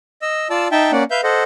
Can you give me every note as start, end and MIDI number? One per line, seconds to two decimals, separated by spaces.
0.22 0.48 75
0.22 0.48 88
0.50 0.68 65
0.50 0.68 74
0.50 0.68 81
0.50 0.68 88
0.72 0.92 63
0.72 0.92 76
0.72 0.92 79
0.72 0.92 81
0.92 1.04 58
0.92 1.04 61
0.92 1.04 74
0.92 1.04 78
1.11 1.21 71
1.11 1.21 76
1.11 1.21 77
1.11 1.21 91
1.23 1.44 69
1.23 1.44 72
1.23 1.44 75
1.23 1.44 78